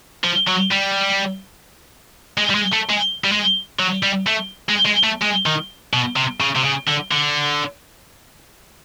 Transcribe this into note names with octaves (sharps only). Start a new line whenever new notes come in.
F3
F#3
G3
G#3
G3
G#3
A3
G#3
G3
G#3
F#3
G3
A3
G#3
G#3
A3
G#3
D#3
B2
C3
C#3
C3
C#3
D3
D3